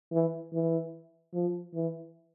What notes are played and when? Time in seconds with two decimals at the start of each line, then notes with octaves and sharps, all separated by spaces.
0.12 E3
0.53 E3
1.34 F3
1.75 E3